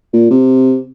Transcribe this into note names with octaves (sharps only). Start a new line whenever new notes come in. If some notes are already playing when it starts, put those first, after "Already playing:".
A#2
C3